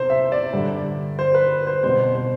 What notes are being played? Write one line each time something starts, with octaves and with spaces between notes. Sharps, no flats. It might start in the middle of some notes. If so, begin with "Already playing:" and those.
Already playing: C3 B3 C5
E5
D5
G2 D3 G3
C5
B4
C5
B2 G3 C4 C5
C5